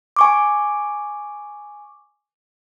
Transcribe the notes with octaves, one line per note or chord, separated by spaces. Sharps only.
G#5 C#6 D6